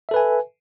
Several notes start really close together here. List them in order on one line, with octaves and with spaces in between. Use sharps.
E5 A4 B4 G#5